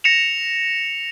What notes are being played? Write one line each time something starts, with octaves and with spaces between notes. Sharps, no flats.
A#6 C#7 E7 F7